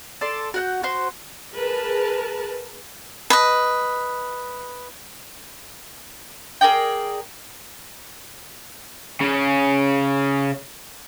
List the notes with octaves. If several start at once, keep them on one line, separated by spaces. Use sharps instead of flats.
A4 D5 C6
F#4 F#5 G6
F#4 C5 C6
G#4 A#4 B4 A5
B4 D#5
G#4 A#4 D5 G5
C#3 C#4